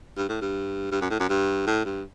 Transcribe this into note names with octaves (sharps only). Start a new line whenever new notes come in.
G2
A2
G2
G2
F#2
A2
F#2
G2
A2
G2